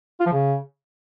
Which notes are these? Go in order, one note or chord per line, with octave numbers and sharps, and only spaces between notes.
F4
F3
C#3